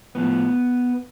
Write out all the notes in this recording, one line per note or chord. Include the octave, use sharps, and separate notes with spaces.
A2 F3 B3